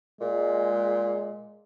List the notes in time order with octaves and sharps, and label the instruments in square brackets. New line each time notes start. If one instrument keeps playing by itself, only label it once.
[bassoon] A#2 [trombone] G#3